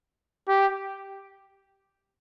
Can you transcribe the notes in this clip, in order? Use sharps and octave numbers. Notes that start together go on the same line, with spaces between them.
G4